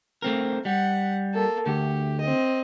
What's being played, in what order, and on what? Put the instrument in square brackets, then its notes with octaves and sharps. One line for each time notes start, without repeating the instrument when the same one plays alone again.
[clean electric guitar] A3 C4 A#4
[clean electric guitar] G3 [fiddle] F#5
[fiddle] A#3 A4
[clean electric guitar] D2 A3 [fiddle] G4
[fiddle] C4 D#5